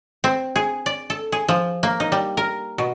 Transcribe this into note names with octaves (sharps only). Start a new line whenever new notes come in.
C4
G#4
D5
A4
G#4
F3
A#3
D#4
G3
A#4
B2